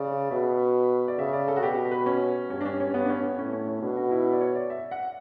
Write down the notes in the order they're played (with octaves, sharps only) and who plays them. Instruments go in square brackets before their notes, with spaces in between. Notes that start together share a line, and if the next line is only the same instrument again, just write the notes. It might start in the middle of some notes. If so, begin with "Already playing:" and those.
Already playing: [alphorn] C#3 [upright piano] D5
[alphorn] B2 [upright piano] E5
[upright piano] D5
[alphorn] C#3 [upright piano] E5
[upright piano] D5
A4
F#4
[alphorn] B2 [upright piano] G4
[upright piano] B4
C#4
[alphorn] G2 [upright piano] C#4
[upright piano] D4
C#4
C#4
B3
D4
C#4
B3
[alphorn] A2 [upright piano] C#4
[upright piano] C#4
C#4
[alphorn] B2 [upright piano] D4
[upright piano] F#4
E4
D5
C#5
D5
E5
F#5